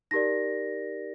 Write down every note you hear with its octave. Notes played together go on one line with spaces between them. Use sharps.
D#4 G4 A#4 D5 A#6